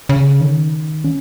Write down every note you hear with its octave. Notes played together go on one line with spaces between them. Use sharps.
C#3
D#3
C#4